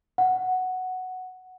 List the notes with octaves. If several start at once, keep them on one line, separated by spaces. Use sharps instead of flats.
F#5